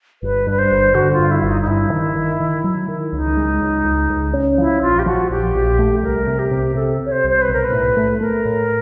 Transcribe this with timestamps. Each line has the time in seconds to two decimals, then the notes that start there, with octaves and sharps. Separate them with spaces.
0.22 G1 B4
0.47 G2 B4
0.59 C5
0.71 G1
0.95 D3 F#4
1.13 F4
1.19 G2
1.31 E4
1.43 G1
1.50 D#4
1.62 D#4
1.67 G2 E4
1.92 D#3
2.15 D#3
2.40 D#3
2.64 F#3
2.88 D#3
3.13 C#2 D#4
3.37 G#3
3.61 C#2
3.85 C#2
4.10 C#2
4.33 C#4
4.58 F3 E4
4.82 A#1 F4
4.99 G4
5.06 F3 F#4
5.30 A#1 G4
5.55 A#1
5.79 A3
6.03 C2 A#4
6.27 C3
6.39 G4
6.51 C3
6.75 C3 A4
7.00 C3
7.06 C#5
7.12 C5
7.24 C2
7.30 C5
7.42 B4
7.48 B1 A#4
7.65 B4
7.72 A2
7.97 A3
8.21 A3 A#4
8.45 A2